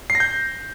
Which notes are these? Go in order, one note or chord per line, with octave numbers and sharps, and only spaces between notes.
C7
A#6
G6